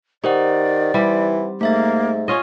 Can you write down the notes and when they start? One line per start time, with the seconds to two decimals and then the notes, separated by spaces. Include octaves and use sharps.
0.24 D#3 D#4 G4 C5 D5 F#5
0.94 E3 G3 C4
1.61 G#2 A3 A#3 E5 A6
2.28 C#4 F4 C#5 D#5